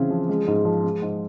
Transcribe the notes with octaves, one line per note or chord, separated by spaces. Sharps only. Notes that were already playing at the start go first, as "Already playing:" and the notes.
Already playing: C#3 E3 C4
F3
G#3
G#2
F3
G#3
G#2